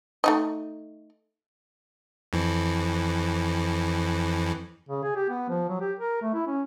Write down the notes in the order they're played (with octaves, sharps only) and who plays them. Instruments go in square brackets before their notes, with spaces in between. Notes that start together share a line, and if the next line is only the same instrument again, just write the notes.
[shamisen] A3 D#4 D#5
[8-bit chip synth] F2 E3
[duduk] C#3
G#4
G4
B3
F3
F#3
G4
A#4
A3
E4
C#4